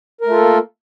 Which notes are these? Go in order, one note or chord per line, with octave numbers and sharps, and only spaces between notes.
A3 A#3 F4 A4 A#4